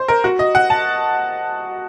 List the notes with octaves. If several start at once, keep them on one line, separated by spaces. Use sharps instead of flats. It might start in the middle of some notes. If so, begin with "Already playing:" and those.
Already playing: C5
A#4
F#4
D#5
F#5
A5